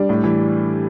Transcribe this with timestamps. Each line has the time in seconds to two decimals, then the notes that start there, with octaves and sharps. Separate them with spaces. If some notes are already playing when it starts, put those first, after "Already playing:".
Already playing: G3 D4 G4
0.09 A2
0.24 E3